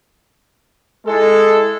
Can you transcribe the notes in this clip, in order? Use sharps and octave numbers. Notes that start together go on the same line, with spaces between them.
G#3 E4 A4